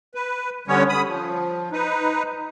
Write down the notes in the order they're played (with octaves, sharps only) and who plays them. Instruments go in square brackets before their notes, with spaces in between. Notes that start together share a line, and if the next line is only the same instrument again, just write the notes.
[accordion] B4
D3 G3 B3 C#4 C#5
B5 D#6
F3
D#4 B4